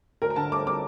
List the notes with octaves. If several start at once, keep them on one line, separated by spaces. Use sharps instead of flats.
D2 A#4
A#5
D3 A5
A3 D6
C4 D6